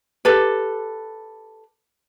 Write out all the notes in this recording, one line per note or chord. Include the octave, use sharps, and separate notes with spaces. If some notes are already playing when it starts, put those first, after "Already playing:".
G4 A4 B4